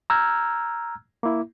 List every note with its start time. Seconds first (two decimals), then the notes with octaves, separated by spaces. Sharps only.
0.10 A#5 E6 F6 G6 G#6
1.23 A#3 E4